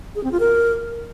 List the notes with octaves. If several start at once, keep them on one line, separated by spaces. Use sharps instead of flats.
G#4
C4
F4
A#4